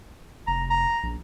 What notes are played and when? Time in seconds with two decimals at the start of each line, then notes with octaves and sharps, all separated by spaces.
0.47 F1 A#5
0.70 A#5
1.03 A#1